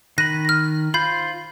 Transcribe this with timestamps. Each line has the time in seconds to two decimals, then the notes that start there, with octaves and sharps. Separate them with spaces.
0.18 D#3 B5 F#6 A#6 D#7
0.45 F6 A#6
0.94 F4 C5 B5 G6 C7